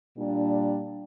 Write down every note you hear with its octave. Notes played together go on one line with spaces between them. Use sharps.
A#2 G3 D4